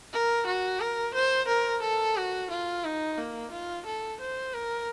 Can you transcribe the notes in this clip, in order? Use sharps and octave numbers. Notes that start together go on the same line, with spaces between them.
A#4
F#4
A#4
C5
A#4
A4
F#4
F4
D#4
A#3
F4
A4
C5
A#4